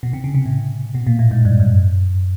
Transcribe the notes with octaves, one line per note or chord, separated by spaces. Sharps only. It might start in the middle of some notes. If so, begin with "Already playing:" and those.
B2
C3
C#3
C3
A2
B2
A#2
A2
G#2
G2
F#2